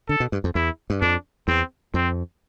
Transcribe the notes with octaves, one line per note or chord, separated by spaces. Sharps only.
D3 A4
B2
G2
F2
E2 E4
G2
F2 D4
E2 C4
F2 C4